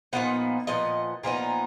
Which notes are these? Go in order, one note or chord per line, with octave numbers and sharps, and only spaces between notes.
A#2 F3 B3 D#4 F#5
A#2 F3 B3 D#5
A#2 F3 B3 D#4